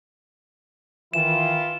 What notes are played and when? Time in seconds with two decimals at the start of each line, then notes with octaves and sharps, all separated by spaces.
1.14 D#3 E3 E4 F4 E7